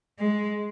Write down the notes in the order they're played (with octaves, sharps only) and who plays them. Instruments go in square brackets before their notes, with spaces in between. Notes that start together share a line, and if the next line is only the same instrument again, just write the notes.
[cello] G#3